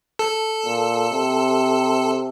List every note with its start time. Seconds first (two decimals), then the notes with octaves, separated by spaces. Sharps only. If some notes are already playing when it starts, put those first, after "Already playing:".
0.19 A4
0.65 A#2
1.11 C3